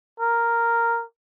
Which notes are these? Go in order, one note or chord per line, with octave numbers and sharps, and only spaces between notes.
A#4